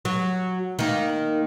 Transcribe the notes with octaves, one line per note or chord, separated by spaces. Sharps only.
F#3
D#3 A#3